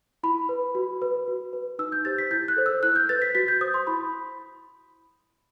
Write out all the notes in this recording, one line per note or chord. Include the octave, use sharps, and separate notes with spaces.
E4 B5
B4
F#4
B4
F#4
B4
D#4 E6
G6
G4 C5 A6
B6
E4 G6
F#6
A4 C5
E6
E4 F#6
G6
B4 A6
B6
F#4 B6
G6
C5 D#6
C6
E4 B5